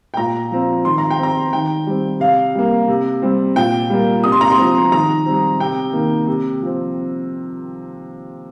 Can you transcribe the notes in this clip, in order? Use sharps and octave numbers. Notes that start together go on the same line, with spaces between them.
G5
A#2 A#5
F3 C4
D#3 C6
A#5
G5
C4 A#5
D#3 G5
G3 C4
C3 F5
G3 A#3
C3
G3 C4
A#2 G5
G3 A#3
C3 D#6
C6
A#5
C6
F3 C4
D#3 A#5
G3 C4
C3 G5
D#3 A#3
C3
F3 C4